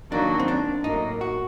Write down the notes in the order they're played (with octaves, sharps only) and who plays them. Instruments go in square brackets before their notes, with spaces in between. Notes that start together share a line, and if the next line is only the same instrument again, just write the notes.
[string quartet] D#3 F#3 A#3 F#4 [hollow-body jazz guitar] D4
[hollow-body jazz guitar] C4
D4
[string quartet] A2 F#3 A#3 [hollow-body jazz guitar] D#4
[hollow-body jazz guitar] F#4